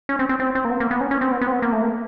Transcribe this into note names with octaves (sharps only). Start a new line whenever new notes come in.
C#4
C4
C4
C4
C4
A#3
B3
A#3
B3
C#4
C#4
C4
B3
B3
C4
B3
A#3
A3
A#3